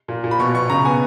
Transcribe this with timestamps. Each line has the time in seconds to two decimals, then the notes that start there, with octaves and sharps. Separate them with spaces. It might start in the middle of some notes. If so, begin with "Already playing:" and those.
0.08 A#2
0.24 A#2
0.31 B5
0.39 B2 C#6
0.55 B2 C#6
0.70 C#3 A#5
0.85 B3 G#5